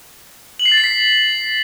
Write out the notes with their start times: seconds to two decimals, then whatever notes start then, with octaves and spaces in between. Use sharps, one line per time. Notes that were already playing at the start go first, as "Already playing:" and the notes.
0.59 F#7
0.66 C7
0.72 A6
0.78 C7
0.84 B6